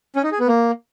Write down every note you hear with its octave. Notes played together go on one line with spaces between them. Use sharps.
C#4
D#4
G#4
B3
A#3